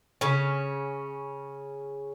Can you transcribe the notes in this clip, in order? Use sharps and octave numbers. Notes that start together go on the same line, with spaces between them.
C#3 C#4